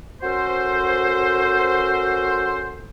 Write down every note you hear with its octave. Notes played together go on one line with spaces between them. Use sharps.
C#4 F#4 A4 A#4 C5